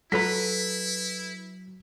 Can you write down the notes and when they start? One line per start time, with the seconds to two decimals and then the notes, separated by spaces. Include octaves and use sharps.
0.12 F#3 E4 A4 B4 A#5 B6